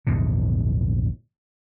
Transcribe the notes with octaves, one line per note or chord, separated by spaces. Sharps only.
A#1 E2 G#2 D3